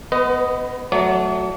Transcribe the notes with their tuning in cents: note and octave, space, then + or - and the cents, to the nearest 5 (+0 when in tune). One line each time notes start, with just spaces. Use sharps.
B3 +10 B4 +40 D#5 +0
F#3 +0 A3 +0 D5 -45